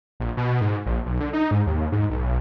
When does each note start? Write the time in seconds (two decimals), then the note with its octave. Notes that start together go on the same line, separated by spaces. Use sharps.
0.20 A#1
0.37 B2
0.61 G#2
0.86 A#1
1.06 B1
1.21 D3
1.33 D#4
1.51 G#2
1.66 D#2
1.92 G#2
2.10 B1